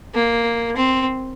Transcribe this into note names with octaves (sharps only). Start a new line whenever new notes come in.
A#3
C4